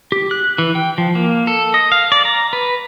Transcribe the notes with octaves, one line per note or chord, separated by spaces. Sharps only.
G4
F#6
E3
G5
F3
A#3
A4
D#5
F5
D5
A#5
B4